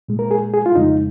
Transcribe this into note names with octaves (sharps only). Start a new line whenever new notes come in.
A#2 G#3
A#4
G#4
G#4
F4
F2 C#3 G#3 D#4